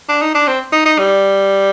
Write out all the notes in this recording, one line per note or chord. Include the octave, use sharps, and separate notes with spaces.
D4
D#4
D4
C4
D#4
D#4
G3